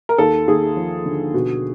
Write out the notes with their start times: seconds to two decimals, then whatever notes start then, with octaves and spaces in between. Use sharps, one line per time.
0.09 A#4
0.18 D#2 A4
0.48 D#2 G#4
0.76 F3
1.06 D3
1.34 B2